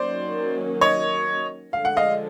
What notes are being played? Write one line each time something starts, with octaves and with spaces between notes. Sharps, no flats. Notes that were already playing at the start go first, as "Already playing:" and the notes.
Already playing: D#3 F#3 A#3 C#4 C5 D5
C#5 D#5
D3 F3 G#3 F5
F#5
D#5 F5